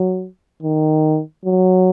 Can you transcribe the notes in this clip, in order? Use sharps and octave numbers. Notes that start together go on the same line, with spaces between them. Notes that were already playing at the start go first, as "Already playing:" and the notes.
Already playing: F#3
D#3
F#3